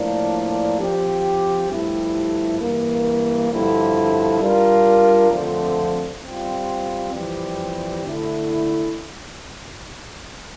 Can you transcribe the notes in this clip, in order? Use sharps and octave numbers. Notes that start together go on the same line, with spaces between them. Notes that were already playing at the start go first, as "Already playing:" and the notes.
Already playing: A2 F3 A#3 D4
F3 C4 G4
G2 F3 A3 E4 G4
G2 E3 A#3
G2 D3 F3 C4 E4
G3 D4 F4 A#4
F2 D3 F3 A3 C4
G3 C4 F4
F2 E3 G3 C4 G4
D3 A3 E4